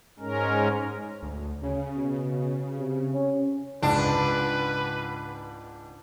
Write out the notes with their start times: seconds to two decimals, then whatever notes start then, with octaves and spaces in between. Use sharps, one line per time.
0.20 G#2 G#3 C#4 A#4
1.23 D2
1.63 C#3 C#4
1.97 B2
2.79 C3
3.14 C#4
3.83 C#2 G#2 D4 B4